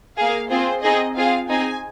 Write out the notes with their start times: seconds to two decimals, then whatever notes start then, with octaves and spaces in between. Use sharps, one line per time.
0.18 A#3 G#4 F5
0.50 C4 F4 G#4 C5
0.83 C4 D#4 G#4 D#5
1.16 C4 F4 G#4 F5
1.49 C4 D#4 G#4 G#5